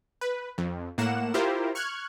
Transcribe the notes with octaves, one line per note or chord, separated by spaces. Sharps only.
B4
F2
A2 A#3 F#5 E7
E4 F4 G4 A#4 C5
C#6 F6 F#6 G#6